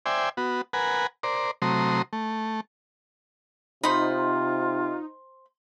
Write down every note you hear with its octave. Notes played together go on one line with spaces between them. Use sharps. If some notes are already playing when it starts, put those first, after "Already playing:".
C5 D5 E5 G5 G#5
B3 F#4
A#4 B4 F#5 G#5
A#4 C5 D5
C3 F#3 A3 A#5 C6 D#6
A3
C3 D#4 F4 C5 B5